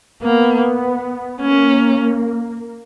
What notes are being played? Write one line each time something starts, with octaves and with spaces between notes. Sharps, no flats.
A#3 B3
A#3 C#4